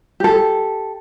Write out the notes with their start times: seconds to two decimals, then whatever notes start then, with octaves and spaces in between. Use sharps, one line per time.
0.20 G4 A4